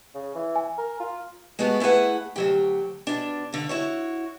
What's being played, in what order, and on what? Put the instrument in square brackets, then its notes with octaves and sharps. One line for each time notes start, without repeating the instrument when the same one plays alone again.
[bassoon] C#3
E3
[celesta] G#5
[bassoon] A#4
F4
[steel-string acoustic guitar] G#3 A3 B3 F#4
A3 E4 G#4 B4 F#5
D2 F#3 G4
B2 D4
G2 D3
E4 F#4 C#5